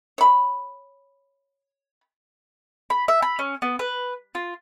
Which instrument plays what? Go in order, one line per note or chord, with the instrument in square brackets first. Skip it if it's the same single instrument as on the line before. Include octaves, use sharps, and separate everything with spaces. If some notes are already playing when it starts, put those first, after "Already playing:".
[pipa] C#5 B5
[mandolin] B5
E5
B5
C#4
B3
B4
F4